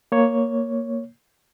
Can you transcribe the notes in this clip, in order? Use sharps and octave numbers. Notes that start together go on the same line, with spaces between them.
A#3 C#5